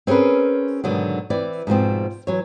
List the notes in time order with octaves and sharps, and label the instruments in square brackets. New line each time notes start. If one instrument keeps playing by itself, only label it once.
[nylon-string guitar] C4 C#4 G#4 A#4 B4
G#2 B2 D3 D#3 F#3
E3 C4 E4 D5
G#2 B2 F3 C4
E3 F#3 C#5